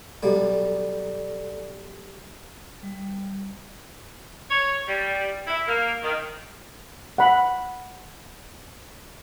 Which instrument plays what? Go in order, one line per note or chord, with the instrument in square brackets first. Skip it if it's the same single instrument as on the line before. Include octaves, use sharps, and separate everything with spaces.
[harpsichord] B1 G3 [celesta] A4 D5
[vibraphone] G3
[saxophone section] C#5
G3
E4
A#3
D#3
[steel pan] F#5 B5